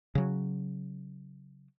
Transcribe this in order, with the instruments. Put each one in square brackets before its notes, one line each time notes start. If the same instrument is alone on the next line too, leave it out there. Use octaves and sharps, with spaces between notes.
[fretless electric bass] C#3 F#3